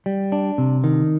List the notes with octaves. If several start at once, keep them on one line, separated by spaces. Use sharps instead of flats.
G3
D4
C3
D#3